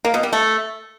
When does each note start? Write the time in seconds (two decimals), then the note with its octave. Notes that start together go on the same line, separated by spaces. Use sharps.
0.05 A#3
0.14 B2
0.23 G3
0.33 A3